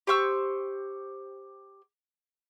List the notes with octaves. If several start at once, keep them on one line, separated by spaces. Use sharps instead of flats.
G4 C5 C#6 E6